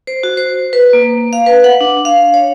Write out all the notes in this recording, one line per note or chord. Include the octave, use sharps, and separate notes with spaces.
C5
F#4
C5
B4
A#3
F5
B4
F#5
D4
F5
C#5